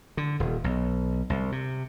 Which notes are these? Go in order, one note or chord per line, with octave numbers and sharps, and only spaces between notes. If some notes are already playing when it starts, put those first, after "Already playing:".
D3
D#1
B1
C2
C3